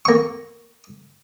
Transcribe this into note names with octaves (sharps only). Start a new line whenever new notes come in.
A#3 C#6